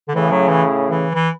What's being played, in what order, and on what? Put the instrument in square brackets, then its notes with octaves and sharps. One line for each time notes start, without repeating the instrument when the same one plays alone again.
[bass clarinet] D3
[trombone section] A2 C#3 [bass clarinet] E3
[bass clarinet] F#3
E3
E3
E3